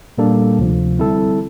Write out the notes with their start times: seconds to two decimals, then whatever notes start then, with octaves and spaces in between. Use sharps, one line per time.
0.18 A#2 G3 A#3 D4 A4
0.59 D2 C3 F3
0.99 D3 G3 C4 E4 A4